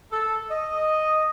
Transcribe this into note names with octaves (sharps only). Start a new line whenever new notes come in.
A4
D#5